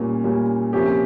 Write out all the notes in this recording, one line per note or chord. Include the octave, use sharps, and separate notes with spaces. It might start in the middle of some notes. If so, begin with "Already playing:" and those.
Already playing: A#2 G3 A#3 C#4
A#2 G3 A#3 C#4
C3 F3 A#3 C#4 G4